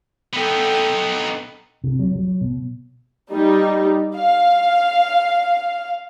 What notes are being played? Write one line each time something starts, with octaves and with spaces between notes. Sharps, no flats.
B3 D#4 A4 G5
C3
F#3
F#3
B2
G3 D#4
F5